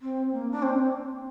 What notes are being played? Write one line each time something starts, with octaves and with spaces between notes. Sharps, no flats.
C4
A#3
D4
C4